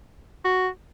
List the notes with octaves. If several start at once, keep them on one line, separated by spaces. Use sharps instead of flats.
F#4